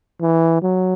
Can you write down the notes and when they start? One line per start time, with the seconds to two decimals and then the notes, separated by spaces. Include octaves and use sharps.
0.21 E3
0.62 F#3